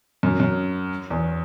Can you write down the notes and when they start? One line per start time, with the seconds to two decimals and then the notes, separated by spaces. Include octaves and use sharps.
0.23 F#2
0.40 F#2
1.10 E2